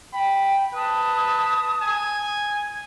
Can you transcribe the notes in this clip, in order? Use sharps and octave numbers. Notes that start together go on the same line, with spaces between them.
G5 B5
B4 A5 D#6
G#5